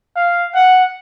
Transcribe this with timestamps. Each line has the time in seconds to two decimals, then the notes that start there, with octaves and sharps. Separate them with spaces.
0.16 F5
0.55 F#5